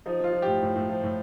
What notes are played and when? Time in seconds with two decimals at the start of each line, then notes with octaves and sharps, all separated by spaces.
0.06 F3 D#4
0.20 F3 F4
0.33 F3
0.42 A2 G4
0.62 A2
0.76 A2
0.89 F3
1.03 A2